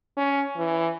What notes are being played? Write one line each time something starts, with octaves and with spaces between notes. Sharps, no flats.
C#4
E3